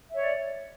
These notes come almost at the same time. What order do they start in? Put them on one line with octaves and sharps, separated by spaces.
E5 C#5 D5